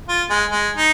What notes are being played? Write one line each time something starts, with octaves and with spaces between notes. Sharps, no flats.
F4
G#3
G#3
D#4